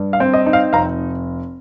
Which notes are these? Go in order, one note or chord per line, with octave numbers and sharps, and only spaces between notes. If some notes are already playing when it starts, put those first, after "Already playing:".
Already playing: G2
F5
C4
D#5
D#4
F5
F1 F5 A#5